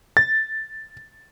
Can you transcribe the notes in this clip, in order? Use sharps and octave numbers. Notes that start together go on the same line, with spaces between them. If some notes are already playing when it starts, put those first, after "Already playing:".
A6